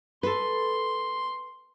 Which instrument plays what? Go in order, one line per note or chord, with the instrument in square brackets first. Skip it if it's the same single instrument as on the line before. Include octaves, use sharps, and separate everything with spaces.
[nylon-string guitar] A4 B4 [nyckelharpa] C6